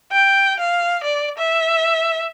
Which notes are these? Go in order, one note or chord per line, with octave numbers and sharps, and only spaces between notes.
G5
F5
D5
E5